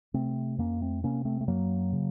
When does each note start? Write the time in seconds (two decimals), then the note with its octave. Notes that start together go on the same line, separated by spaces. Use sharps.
0.14 C3 A3 C4
0.58 F2 A#3 C#4
0.81 A3 C4
1.03 C3 A#3 C#4
1.25 A3 C4
1.41 A3
1.48 F#2 F#3 A#3
1.92 C#3